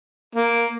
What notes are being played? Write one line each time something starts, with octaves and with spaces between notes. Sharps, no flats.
A#3